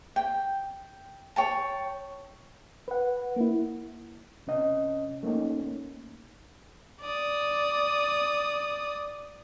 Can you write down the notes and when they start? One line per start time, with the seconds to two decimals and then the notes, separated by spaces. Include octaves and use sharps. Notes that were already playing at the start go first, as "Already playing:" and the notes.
0.16 G5
1.36 C#5 G5 A5
2.88 B4 F#5
3.36 A#3 E4
4.47 C3 C#4 D#5
5.23 A3 A#3 C#4 D#4
7.01 D5 D#6